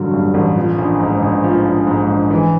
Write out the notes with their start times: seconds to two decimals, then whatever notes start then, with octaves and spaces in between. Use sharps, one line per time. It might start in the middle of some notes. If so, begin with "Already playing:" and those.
Already playing: A1 G2 D3 F#3
0.13 G2
0.34 A1
0.56 F3
0.78 A#1
0.99 G#2
1.22 A#1
1.44 F3
1.65 A#1
1.87 G#2
2.08 A#1
2.31 E3